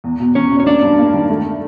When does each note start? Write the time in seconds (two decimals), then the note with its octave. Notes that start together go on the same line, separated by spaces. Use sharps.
0.04 E2
0.20 B2
0.35 E2 C#4 C#5
0.51 B2
0.60 C#5
0.67 A#3 D4 D5
0.83 G2
0.98 A#3
1.14 D#3
1.29 A3